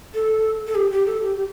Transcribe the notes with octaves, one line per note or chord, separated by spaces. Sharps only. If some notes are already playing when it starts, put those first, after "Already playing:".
A4
A4
G4
G4
A4
G4
G4